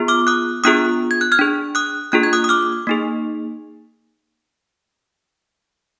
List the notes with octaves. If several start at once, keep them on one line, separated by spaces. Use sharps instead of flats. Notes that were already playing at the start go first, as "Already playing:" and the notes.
Already playing: B3 F4 G#4
D6 F6
D#6 F#6
B3 D4 F4 G#4 D#6 F#6
G#6
F#6
F6 G#6
D4 G#4
D#6 F#6
A#3 D4 F4 G#4 F#6
G#6
D#6 F#6
D#6
D6 F6
A#3 D#4 G#4